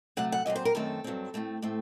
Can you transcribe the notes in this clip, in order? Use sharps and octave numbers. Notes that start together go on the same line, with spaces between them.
C3 F#3 A3 F#5
F#5
A#2 F#3 C4 D#5
C5
A#4
F#2 D#3 A3 C4 A4
G2 F#3 C4
A2 A3 C4
A2 A3 C4